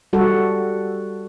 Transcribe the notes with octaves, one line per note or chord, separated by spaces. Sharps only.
G3 F#4 A4